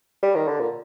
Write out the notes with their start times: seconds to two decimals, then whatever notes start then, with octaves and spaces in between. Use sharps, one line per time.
0.23 G3
0.35 D#3
0.48 D3
0.60 A#2